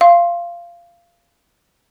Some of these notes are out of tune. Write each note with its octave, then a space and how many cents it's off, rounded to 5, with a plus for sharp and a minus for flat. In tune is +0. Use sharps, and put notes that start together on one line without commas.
F5 -15 C6 +20